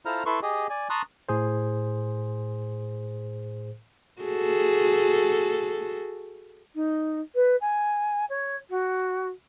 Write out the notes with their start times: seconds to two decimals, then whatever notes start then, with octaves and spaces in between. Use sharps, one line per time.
0.06 E4 F4 A4 C5 A#5 F6
0.26 E4 A4 B4 C6 C#6
0.42 G4 G#4 D#5
0.70 D5 G#5
0.90 A5 A#5 C6 C#6 D#6 F#6
1.29 A2 G#4 C5
4.22 F#4 G#4 A4
6.75 D#4
7.35 B4
7.61 G#5
8.30 C#5
8.70 F#4